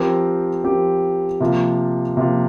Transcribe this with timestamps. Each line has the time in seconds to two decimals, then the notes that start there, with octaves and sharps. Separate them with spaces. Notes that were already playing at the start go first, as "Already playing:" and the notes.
Already playing: F3 C4 G4 A#4
0.64 F3 C4 G4 A#4
1.40 C3 F3 A#3 F4
2.17 C3 F3 A#3 F4